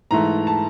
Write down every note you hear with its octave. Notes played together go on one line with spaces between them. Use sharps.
G#2 E3 A3 A#5
A5